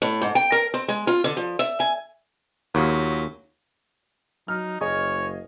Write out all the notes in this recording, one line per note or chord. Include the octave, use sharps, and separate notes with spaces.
A2
G#2
G5
A#4
C4
G#3
F4
D3
F3
E5
G#5
D#2 A#2 F3 F#3
F#3 D#4 F6
F#1 G#4 C#5 D#5